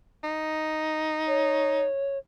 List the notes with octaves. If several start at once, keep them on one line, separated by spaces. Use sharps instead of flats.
D#4
C#5